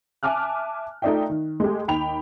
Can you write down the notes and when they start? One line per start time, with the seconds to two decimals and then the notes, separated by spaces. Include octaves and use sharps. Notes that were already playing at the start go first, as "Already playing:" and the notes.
0.23 E5 G#5 A5 D6 F6 F#6
1.02 A3 D#4 F4 D5 E5 G5
1.30 D#3
1.60 G#3 A3 G4
1.88 D#2 G5 B5 F7